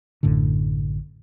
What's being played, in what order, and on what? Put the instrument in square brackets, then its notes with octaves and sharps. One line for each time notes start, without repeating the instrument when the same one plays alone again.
[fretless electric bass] A1 F#2 A2 D3